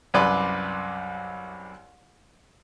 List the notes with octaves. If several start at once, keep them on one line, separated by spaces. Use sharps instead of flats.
C2 F#2 B4 D5 C6 D6